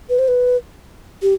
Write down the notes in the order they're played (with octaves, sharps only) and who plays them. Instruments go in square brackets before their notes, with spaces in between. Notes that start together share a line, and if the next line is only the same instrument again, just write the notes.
[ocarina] B4
C5
B4
G4